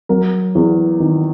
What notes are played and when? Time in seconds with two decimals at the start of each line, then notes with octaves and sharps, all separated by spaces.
0.09 F#3 A#4
0.55 E2
1.00 D#3